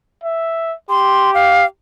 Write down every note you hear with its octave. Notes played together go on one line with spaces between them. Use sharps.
E5
G4 C6
F5